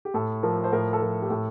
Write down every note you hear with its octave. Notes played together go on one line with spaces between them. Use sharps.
G4
A2 A4
F3 A#4
C5
A2 A#4
A4
F3 A#4
G4
A2 A4